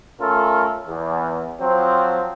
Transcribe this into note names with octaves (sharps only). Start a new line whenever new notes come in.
A3 C#4 F4 A4 A#4
E2
F3 F#3 C4